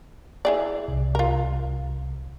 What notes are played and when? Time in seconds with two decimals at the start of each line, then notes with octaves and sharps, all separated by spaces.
0.45 E4 G#4 D5
0.88 C2
1.15 F4 A#4